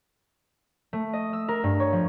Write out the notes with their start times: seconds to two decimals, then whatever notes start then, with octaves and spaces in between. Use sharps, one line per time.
0.93 A3
1.13 D#5
1.33 E6
1.48 A#4
1.64 G2
1.80 C#5
1.92 F3